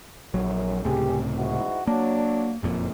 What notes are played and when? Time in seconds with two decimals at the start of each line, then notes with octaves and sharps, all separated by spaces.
0.34 A#1 F#2 F#3
0.85 C#2 A2 C3 G4 G#4
1.38 G#2 E4 F#4
1.87 F#3 A#3 D4
2.63 F#1 F2 A#2